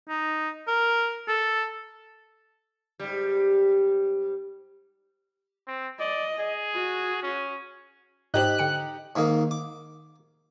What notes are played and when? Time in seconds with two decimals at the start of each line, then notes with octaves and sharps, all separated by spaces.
0.09 D#4
0.67 A#4
1.28 A4
2.99 G#2 G3
5.68 C4
5.99 D5 D#5
6.39 G#4
6.75 F#4
7.23 C#4
8.34 G#2 D#4 G4 C5 F#6 F#7
8.58 D3 G5 C#7
9.16 G#2 D#3 A#3 D#4
9.51 D6